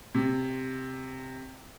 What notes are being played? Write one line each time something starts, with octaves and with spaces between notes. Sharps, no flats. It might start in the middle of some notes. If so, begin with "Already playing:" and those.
C3